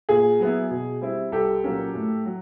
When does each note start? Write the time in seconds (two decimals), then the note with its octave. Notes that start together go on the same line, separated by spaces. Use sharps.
0.09 A#2 G#4
0.40 F#3 B3 E4
0.71 B2
1.01 G3 C4 E4
1.32 C2 G4 A4
1.64 A#2 F#3 A#3 C#4
1.95 A2
2.25 F#3